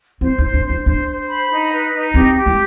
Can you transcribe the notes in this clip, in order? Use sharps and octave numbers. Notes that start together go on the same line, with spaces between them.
C4 C5
D#4 C5
D4
C5
D4
D4 C5
C5
B5
D#4
B4
D#4
C4 G4
G4
G#3